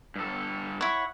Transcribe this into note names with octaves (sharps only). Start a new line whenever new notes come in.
G2 A4
E4 C#5 F#5